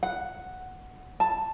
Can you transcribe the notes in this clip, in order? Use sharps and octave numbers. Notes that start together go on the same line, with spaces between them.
F#5
A5